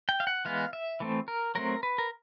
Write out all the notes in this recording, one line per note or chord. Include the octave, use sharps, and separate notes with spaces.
G5
F5
F#5
E3 G#3 B3 F5
E5
E3 A3 C4
A#4
F#3 A3 C4 A#4
B4
A#4